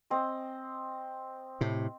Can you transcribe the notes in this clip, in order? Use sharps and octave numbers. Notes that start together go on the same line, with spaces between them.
C4 D#5
A2 C3